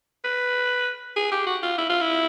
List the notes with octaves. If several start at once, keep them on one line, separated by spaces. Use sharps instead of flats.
B4
G#4
G4
F#4
F4
E4
F4
E4